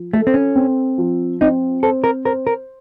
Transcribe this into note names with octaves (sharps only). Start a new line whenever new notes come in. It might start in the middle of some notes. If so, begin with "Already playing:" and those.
Already playing: F3
A3 A4
C4
C#4
C4
F3
C4 D#4
A4 C5
A#4
A#4 C5
A#4